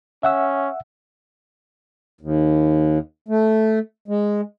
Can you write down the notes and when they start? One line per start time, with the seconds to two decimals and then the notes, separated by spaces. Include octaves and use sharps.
0.23 C#4 E5 F#5 E6
2.21 D#2
3.29 A3
4.08 G#3